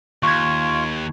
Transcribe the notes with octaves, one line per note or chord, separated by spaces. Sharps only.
D#2 F4 C#6 G#6